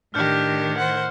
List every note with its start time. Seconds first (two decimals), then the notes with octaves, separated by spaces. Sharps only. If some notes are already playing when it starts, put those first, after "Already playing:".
0.14 A2 D#3 D4 G4 F6 G6 C#7
0.77 C5 F#5